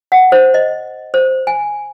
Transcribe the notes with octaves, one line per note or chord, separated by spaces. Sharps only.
F#5
C5
D#5
C5
G#5